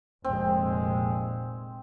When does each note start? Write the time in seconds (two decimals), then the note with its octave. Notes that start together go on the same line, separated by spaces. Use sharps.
0.24 F1 A#2 G#3 C4